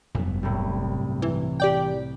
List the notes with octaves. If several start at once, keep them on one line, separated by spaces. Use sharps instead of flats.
F1 G2 F#3 B3
C2 A2
E3
G4 D5 G5